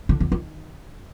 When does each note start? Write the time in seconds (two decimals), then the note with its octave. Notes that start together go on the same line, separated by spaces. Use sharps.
0.09 D3
0.20 E2
0.32 D#3